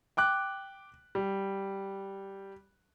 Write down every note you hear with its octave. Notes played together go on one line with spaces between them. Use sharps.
G5 D6 F#6
G3